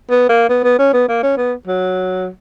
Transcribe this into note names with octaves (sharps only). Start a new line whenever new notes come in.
B3
A#3
B3
B3
C#4
B3
A#3
C#4
B3
F#3